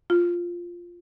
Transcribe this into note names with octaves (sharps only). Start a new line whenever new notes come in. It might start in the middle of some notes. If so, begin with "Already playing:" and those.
F4